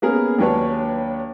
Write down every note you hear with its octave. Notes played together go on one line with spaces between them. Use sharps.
A#3 B3 C#4 G#4 A#4
D#2 F#3 D4 B4 C#5 A5